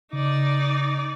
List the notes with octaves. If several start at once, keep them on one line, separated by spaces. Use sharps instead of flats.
C#3 D#4 D5